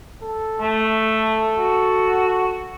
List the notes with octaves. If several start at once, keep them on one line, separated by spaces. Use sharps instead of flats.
A4
A3
F#4